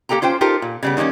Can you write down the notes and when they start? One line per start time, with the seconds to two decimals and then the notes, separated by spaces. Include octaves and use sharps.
0.09 A#3 G4 A4 G5 A#5
0.22 C#4 F4 C5 G5
0.41 D#4 F4 G4 A4 A#4 C5
0.62 A#2
0.83 C#3 G3 B3
0.97 D#3 G3 A#3 C4 C#4